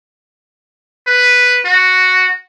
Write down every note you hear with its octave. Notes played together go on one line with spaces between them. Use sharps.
B4
F#4